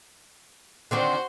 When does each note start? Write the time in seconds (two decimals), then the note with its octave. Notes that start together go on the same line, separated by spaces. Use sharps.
0.91 D3 D#3 C4 F#4 C5 C6